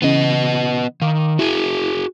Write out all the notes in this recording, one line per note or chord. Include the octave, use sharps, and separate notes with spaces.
C#3 E3 B3 D#5
D#3 F5 D6
E4 F#4 G#4